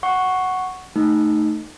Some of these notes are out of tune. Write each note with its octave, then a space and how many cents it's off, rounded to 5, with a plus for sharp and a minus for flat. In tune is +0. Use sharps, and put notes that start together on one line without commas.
F#5 +0 C#6 +0
A3 +5 D#4 -10